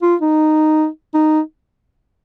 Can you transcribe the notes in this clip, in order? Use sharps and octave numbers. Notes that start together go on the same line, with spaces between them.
F4
D#4
D#4